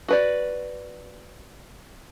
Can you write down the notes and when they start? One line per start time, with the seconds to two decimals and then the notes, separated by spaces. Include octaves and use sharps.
0.08 F#4 B4 D5